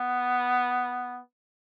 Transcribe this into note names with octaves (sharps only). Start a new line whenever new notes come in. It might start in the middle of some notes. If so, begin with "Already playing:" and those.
Already playing: B3